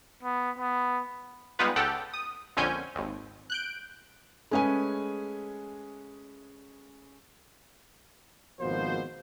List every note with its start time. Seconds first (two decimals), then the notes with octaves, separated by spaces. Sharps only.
0.23 B3
0.58 B3
1.59 G3 G#3 B3 D#4 F4 B4
1.76 C#2 G4 A4 F#5 G5
2.13 D#6
2.57 A#1 F2 D3 C#4 G#5 G6
2.95 G#1 D#2
3.50 F#6 G6 D7
4.51 G#3 A3 C#4 G#4 B4 G#5
8.59 G#1 B2 F3 A#3 C5